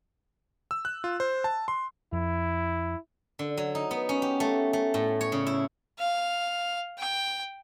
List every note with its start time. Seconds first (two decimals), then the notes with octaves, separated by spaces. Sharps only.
0.71 E6
0.85 F#6
1.04 F4
1.20 C5
1.44 A5
1.68 C6
2.13 F2 E4
3.39 D3
3.57 F#3
3.75 D#4
3.91 B3
4.09 C#4
4.22 G4
4.40 A3
4.73 A3
4.94 A2
5.21 C#5
5.32 C#3
5.47 E4
5.99 F5
6.98 G5